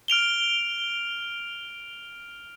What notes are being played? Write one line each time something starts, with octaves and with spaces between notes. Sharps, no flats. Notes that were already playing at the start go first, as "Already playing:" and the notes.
F6 D7 F7 G7